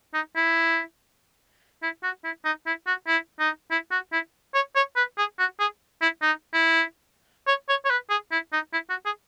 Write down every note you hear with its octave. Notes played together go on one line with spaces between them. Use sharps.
D#4
E4
E4
F#4
E4
D#4
E4
F#4
E4
D#4
E4
F#4
E4
C#5
C#5
B4
G#4
F#4
G#4
E4
D#4
E4
C#5
C#5
C#5
B4
G#4
E4
D#4
E4
F#4
G#4